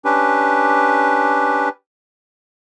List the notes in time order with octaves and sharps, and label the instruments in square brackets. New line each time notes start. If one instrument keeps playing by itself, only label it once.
[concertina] C#4 D4 G4 B4